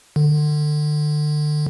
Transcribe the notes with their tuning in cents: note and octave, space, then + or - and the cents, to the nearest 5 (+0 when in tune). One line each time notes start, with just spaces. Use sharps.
D3 +35